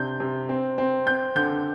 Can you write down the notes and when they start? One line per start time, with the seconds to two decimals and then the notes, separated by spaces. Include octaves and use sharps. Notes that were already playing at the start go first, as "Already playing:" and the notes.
Already playing: C3 D4 G6
0.20 C3
0.49 C4
0.78 C4
1.06 C4 G6
1.36 D3 G6